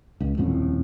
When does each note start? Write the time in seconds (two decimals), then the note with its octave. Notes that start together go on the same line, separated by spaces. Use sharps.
0.21 C#2
0.37 D#1 A1 F2 A2